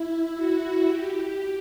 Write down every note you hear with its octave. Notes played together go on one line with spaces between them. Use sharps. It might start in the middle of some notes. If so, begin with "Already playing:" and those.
Already playing: E4
F#4
G4